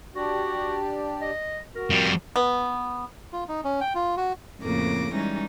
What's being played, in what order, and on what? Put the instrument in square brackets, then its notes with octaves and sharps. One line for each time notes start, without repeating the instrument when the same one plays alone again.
[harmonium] D4 G4 D5 [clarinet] F#4
[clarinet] D#5
[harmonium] F#4 [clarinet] A#4
[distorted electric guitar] F2 G3
[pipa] B3
[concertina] F4
D#4
C#4
G5
F4
F#4
[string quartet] F2 A2 C#3 A#3 D6 A#6
E3 G3 G#3 C#4 D#4